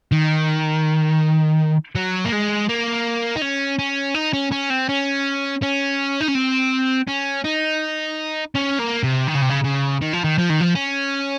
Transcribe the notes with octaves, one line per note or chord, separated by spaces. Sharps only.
D#3
F#3
A#3
G#3
A#3
D#4
C#4
C#4
D#4
C#4
C#4
C4
C#4
C#4
D#4
C#4
C4
C#4
D#4
C#4
A#3
C3
D#3
C#3
C3
C#3
C#3
D#3
F3
D#3
F3
D#3
F3
C#4